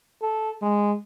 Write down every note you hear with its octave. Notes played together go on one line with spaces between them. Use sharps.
A4
G#3